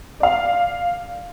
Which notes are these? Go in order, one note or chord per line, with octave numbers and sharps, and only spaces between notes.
D5 F5